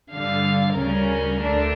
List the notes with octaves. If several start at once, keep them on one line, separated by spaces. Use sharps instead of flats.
G2 D3 G3 F5
D2 C#3 G3 C#4 A#4
D2 D3 A3 D4